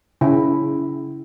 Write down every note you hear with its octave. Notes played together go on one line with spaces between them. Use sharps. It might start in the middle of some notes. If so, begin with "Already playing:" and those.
C#3 E4